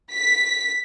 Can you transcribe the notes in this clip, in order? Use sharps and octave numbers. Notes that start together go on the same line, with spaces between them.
B6